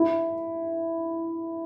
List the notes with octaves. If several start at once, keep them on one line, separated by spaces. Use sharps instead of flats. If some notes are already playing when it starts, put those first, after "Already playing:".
Already playing: E4